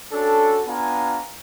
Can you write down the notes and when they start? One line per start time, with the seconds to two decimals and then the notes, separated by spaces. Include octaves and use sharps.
0.12 C#4 D4 F#4 A4
0.67 B3 D4 F4 F5 G#5 A#5